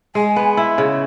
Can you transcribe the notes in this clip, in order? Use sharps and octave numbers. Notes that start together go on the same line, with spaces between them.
G#3 G#5
B3
E4
C#3